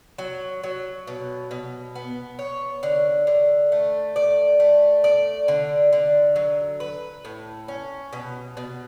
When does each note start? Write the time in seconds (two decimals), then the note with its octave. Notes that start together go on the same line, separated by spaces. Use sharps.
0.18 F#3
0.64 F#3
1.07 B2
1.51 B2
1.95 B3
2.39 C#5
2.83 D3
3.27 D3
3.72 A3
4.16 D5
4.60 A3
5.04 D5
5.48 D3
5.93 D3
6.36 F#3
6.80 B4
7.25 A2
7.68 C#4
8.13 B2
8.57 B2